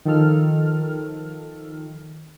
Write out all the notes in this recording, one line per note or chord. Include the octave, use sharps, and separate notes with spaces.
D#3 F3 A4 F6